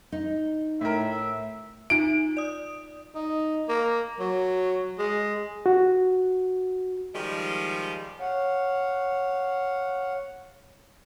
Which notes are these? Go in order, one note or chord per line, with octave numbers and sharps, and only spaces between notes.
D#4
A2 A#4 E5
D#4 F4 E5 D7
D5 D#6
D#4
A#3
F#3
G#3
F#4
D#3 F3 G3 G#3
C#5 F5 F#5